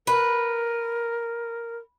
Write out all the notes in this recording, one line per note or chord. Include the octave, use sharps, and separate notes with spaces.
A#4 B4